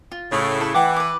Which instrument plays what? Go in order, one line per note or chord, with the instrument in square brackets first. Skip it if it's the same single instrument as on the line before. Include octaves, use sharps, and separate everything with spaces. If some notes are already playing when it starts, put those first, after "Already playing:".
[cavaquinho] F4
[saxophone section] A2 C#3
[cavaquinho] E4 A4
[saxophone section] E3 [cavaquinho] F#5 G5 D6
[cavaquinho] B4 D6